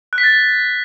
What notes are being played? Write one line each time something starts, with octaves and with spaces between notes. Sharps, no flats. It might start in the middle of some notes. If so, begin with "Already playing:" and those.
F#6
B6
A6